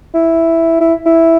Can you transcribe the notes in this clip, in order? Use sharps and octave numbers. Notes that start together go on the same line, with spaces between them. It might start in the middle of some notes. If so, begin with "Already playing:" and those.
E4
E4
E4